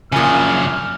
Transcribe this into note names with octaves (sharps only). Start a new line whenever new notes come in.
A#1 F#2 A#2 C#3 G#5 D#6 F6